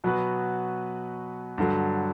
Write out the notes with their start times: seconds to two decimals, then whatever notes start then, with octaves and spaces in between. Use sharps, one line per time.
0.04 B2 F#3 B3 F#4 B4
1.58 G2 D3 F#3